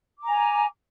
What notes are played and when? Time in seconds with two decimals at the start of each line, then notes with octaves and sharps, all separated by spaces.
0.18 D6
0.23 A#5
0.27 G#5